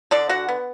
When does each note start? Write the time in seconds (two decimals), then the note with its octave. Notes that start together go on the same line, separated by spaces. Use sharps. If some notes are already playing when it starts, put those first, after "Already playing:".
0.11 D3 D4 D5
0.29 F#4 F#5
0.49 B3